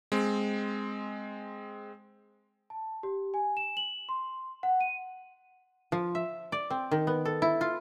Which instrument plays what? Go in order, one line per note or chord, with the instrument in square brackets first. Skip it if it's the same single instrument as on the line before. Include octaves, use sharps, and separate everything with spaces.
[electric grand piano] G#3 C4
[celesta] A5
G4
G#5
E7
F#7
C6
F#5
D#7
[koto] F3
E5
D5
C4
D#3
B3
A4
E4
F4